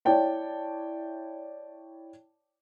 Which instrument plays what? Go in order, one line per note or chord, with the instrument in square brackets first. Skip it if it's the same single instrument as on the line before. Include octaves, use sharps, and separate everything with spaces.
[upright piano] E4 C#5 D5 G5 A5